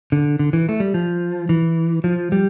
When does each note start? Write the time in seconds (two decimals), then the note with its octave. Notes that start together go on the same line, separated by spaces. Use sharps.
0.12 D3
0.39 D3
0.53 E3
0.69 A3
0.80 G3
0.94 F3
1.49 E3
2.04 F3
2.32 G3